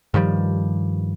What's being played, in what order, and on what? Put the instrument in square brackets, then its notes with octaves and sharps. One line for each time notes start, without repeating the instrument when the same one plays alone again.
[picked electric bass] G2 D#3 F3 G3